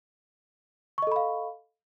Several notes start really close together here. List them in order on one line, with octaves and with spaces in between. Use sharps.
C#6 D#5 A4 B5 F5